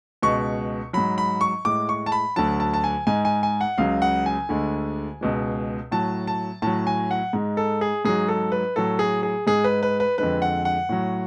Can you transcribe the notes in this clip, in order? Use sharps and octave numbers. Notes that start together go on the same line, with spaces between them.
C#2 B2 G#3 C#6
G#2 F#3 B5
B5
C#6
A2 G#3 D6
C#6
A5
B5
D2 D3 F#3 A5
A5
A5
G#5
G#2 G#3 G#5
G#5
G#5
F#5
C#2 C#3 F#3 F5
F#5
G#5
D2 D3 G#3
C#2 B2 G#3
A2 F#3 A5
A5
A2 F#3 A5
G#5
F#5
G#2 G#3
A4
G#4
G#2 F#3 G#4
A4
B4
A2 F#3 A4
G#4
G#4
G#2 G#3 G#4
B4
B4
B4
F2 D3 G#3 B4
F#5
F#5
A2 F#3